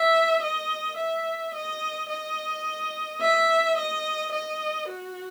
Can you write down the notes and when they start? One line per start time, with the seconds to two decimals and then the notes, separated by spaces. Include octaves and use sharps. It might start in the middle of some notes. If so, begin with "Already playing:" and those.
Already playing: E5
0.42 D#5
0.97 E5
1.54 D#5
2.09 D#5
3.21 E5
3.77 D#5
4.32 D#5
4.88 F#4